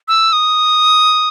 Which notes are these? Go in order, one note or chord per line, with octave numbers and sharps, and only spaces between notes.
E6
D#6